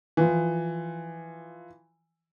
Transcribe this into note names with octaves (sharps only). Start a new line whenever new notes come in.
E3 F3